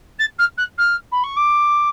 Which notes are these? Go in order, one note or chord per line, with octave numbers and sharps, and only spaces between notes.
A6
F6
F#6
F6
B5
C#6
D6